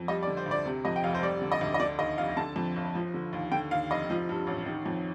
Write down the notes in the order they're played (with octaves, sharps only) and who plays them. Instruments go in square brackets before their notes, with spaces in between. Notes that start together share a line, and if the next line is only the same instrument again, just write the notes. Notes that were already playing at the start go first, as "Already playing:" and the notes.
Already playing: [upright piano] F2
G3 D#5
D5
D3
C5
D2
D5
C3
F2 D#5
G5
F1 F5
C5
G3 D5
D3
D#5
D2
D#5
D3 D5
D#2 D#5
F1 F5
D3 A5
F2
G1
F3
D3
D#2
D3 G5
D#2 F5
F1 D#5
F3
G2
A1
D#3
F2